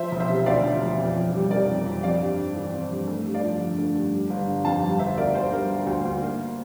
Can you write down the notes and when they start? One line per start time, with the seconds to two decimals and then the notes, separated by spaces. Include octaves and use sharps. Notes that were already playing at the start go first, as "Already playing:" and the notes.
Already playing: F3 C5 E5
0.11 E1
0.20 C5 E5
0.29 C3
0.46 D2 D5 F5
0.63 F3
0.81 E1
0.98 F2
1.16 F2
1.34 G3
1.51 C3 A#4 D5
1.68 F2
1.85 F2
2.03 C4 D5 F5
2.20 G2
2.38 G3
2.56 E3
2.73 C4
2.90 G2
3.08 A3
3.25 G2
3.34 D5 F5
3.43 F3
3.61 D3
3.78 A3
3.95 G2
4.13 G3
4.30 G1
4.47 D3
4.65 F2 F5 A5
4.83 G3
4.99 G1 C5 E5
5.18 D2 A#4 D5
5.35 D2 C5
5.52 G3 A#4
5.70 D3
5.87 D2
6.05 D2
6.23 A#3